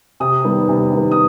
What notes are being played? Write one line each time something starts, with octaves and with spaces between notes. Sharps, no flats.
C3 D#6
D#3 G3 B3
C3
D#3 G3 B3
D#6